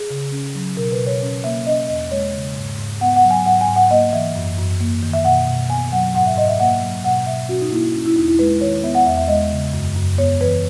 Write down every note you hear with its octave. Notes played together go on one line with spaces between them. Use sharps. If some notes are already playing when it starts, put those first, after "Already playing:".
Already playing: G#4
C#3
C#4
F#3
B2 A#4
B4
B2
C#5
C#4
A#3 E5
C#4 D#5
E2 D#5
G#3 C#5
C#3
G#2
G#2
B3 F#5
F#5
F#3
G#5
G#2 F#5
G#5
G#2
F#5
A#3 D#5
E3 E5
F#2
F#2
A#3
D#3
E5
B2 F#5
B2
B3 G#5
F#3 F#5
G#2 F#5
E5
G#2 D#5
E5
A#3 F#5
F#3
B2 F#5
B2 E5
C#4 F#4
D#4
A#3 E4
C#4
E4
E2 D#4
E4
G#3 B4
D#3 C#5
B3 E5
F#5
E2 E5
E5
G#3 D#5
C#3
F#2
F#2
B3 C#5
E3 B4